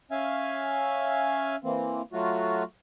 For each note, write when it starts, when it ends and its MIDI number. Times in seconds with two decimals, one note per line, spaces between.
0.11 1.56 61
0.11 1.56 76
0.11 1.56 77
0.11 1.56 80
1.64 2.02 52
1.64 2.02 58
1.64 2.02 60
2.13 2.63 54
2.13 2.63 57
2.13 2.63 65
2.13 2.63 66